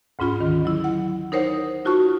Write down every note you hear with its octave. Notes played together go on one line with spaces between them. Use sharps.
D2 G#2 C#4 F4 B5
D3 D#3
F#3 E4
F#5
D#4 A#4 C5 C#5 F#5
D#4 F4 F#4 A5 C#6